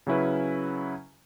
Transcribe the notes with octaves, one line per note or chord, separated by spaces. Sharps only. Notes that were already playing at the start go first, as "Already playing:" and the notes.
C#3 F#3 C#4 E4 B4